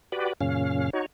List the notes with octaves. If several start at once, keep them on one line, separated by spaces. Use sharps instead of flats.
F#4 G4 B4 D5
F#2 A#2 C#3 C#4 F5
D#4 F#4 C#5